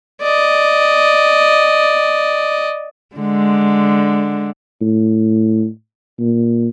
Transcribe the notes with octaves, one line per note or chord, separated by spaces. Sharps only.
D5 D#5
D3 G#3
A2
A#2